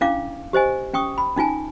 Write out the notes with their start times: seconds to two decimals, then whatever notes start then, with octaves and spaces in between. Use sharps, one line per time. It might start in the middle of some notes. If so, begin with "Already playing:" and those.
0.01 C#4 D4 E4 F5 D6
0.53 G4 C5 D#5 G#5
0.94 C#4 G5 C#6 D#6
1.18 B5
1.36 C#4 D#4 F4 G#5 A5